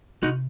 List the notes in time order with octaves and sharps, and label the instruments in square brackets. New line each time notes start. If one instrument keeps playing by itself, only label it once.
[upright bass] C3 [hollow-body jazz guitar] D#4 F#4